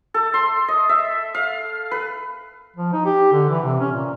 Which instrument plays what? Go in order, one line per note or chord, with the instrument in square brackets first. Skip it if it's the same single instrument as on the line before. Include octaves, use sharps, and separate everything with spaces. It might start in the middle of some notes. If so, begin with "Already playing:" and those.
[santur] A4
C6
D#5
E5
F5
B4
[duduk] F3
D#4
G4
D3
E3
C3
C#4
A#2